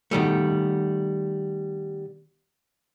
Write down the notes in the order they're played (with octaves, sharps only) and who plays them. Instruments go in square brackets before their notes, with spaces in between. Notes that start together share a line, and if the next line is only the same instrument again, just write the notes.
[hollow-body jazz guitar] B2 D#3 G3 A3